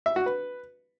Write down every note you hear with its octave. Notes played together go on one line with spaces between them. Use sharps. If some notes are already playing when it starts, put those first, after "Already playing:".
E5
F#4
B4